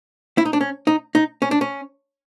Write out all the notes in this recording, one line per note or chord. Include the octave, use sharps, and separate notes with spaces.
E4
D#4
D4
C#4
D#4
D#4
C#4
D4
C#4